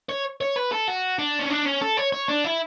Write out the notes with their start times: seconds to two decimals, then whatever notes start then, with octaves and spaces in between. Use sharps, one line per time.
0.09 C#5
0.41 C#5
0.56 B4
0.72 A4
0.88 F#4
1.19 D4
1.39 C#4
1.50 D4
1.66 C#4
1.82 A4
1.97 C#5
2.13 C#5
2.28 D4
2.44 E4